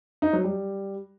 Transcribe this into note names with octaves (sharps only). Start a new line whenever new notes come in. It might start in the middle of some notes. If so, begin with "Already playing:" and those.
D#4
F#3
G3